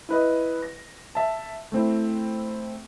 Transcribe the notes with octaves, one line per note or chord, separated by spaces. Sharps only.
E4 B4 D#5
A#6
E5 A5
A3 C4 E4